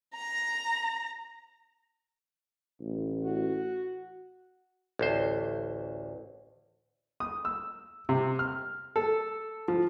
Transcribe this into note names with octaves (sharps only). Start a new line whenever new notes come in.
A#5 A#6
A1
F#4
A1 D2 C5
D#6
E6
C3
F6
A4
F3